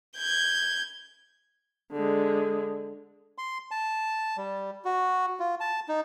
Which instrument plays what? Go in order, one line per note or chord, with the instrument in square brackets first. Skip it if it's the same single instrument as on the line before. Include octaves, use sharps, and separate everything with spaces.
[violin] G6 G#6
[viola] D3 G#3
[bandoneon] C6
A5
G3
F#4
F4
A5
D#4